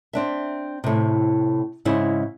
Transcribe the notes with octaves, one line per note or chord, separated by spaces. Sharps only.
C4 D4 E5
A2 C3
G#2 C#3 C4 E4